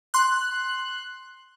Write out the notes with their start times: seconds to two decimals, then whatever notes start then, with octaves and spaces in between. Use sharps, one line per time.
0.14 C6 F#6